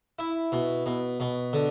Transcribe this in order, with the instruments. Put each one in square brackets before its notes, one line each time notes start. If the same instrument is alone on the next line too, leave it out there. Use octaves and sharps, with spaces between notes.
[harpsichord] E4
B2
B2
B2
D3